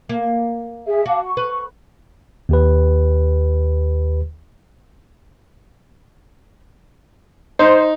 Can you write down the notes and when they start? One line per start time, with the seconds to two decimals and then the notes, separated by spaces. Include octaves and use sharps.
0.09 A#3
0.87 G#4 E5
1.06 F#4 F5 A5 D6
1.23 C#6
1.37 B4
2.49 D#2 G4 B4
7.59 D#4 C5